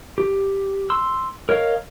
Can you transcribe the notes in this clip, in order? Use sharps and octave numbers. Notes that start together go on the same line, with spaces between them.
G4
C6 E6
A#4 C#5 D#5 F5